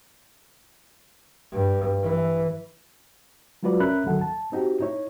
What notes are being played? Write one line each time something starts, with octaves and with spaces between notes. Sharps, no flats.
G2
E3
F#3 G#3 F4 F#4 B4 D5
C2 C#4 A#4 E5 B5 F#6
C#2 D3 D#3 F#3 A4 F#5
A5
C4 D#4 F#4 G4
D#4 E4 C#5